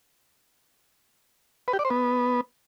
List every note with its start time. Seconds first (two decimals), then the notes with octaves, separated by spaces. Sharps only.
1.68 B4
1.73 G4
1.79 D5
1.85 C5
1.90 B3